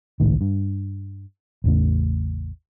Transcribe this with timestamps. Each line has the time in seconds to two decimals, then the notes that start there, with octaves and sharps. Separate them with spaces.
0.20 G#1 C#2 A2 D#3
0.41 G2
1.64 A1 E2 C#3 A3